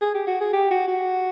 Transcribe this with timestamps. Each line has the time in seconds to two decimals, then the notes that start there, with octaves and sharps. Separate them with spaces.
0.01 G#4
0.14 G4
0.27 F#4
0.41 G#4
0.53 G4
0.71 F#4
0.87 F#4